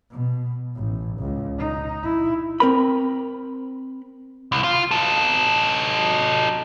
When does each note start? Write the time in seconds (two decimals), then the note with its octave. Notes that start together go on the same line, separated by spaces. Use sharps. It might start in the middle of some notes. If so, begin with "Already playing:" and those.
0.10 B2
0.75 A1
1.20 C#2
1.58 D#4
2.03 E4
2.60 C4 A#4 B5
4.52 C2
4.64 F4
4.91 D#4 A4